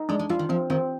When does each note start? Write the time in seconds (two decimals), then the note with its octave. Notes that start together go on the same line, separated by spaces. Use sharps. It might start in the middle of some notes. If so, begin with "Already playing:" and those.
Already playing: D#4
0.09 G#3 D4
0.19 G#3
0.29 G3 F4
0.39 D#3
0.49 F3 C4
0.70 D#3 C4